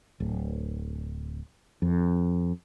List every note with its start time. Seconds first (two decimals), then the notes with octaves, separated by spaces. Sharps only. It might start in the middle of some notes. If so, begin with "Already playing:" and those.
0.20 D1
1.82 F2